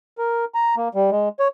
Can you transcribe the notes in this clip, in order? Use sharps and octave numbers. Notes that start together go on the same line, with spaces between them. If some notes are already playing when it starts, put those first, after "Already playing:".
A#4
A#5
A#3
G3
G#3
C#5